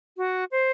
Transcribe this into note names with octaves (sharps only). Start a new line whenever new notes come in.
F#4
C5